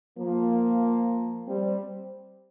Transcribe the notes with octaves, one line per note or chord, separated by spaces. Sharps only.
F3 A#3
G3 C4